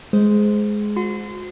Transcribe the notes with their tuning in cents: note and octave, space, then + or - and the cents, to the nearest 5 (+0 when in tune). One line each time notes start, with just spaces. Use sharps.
G#3 +10 C5 -10
F#4 -35 C6 -35